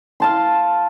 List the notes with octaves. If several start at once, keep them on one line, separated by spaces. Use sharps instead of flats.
F5 A5 C6